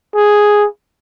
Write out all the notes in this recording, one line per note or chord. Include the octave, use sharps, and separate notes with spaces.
G#4